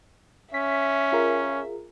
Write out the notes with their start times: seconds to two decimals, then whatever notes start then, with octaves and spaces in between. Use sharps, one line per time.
0.54 C#4 E5 B6
1.12 F4 G#4 A#4